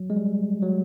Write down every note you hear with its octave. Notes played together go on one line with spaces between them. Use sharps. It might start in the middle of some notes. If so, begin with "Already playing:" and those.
Already playing: F#3
G#3
G3
F#3